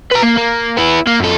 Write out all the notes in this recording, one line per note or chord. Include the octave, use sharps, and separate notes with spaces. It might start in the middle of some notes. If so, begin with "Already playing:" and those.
B4 A#5
A#3
A#3
B3 E4
A#3
F#2 A4